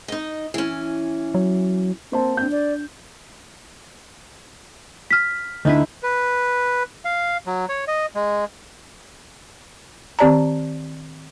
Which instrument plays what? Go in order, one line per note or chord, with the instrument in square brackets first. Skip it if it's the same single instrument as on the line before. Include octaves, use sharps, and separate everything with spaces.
[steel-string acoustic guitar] D#4 D#5
E3 C#4
[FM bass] F#3
[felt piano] A#3 C5 A5 [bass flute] C4
[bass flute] C4 [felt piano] D4 G6
[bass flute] D5
[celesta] F6 B6
[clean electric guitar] D2 D3 [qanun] D#4 E4 B4
[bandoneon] B4
F5
F#3
C#5
D#5
G#3
[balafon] D#3 C4 G4 D5 A5 A#5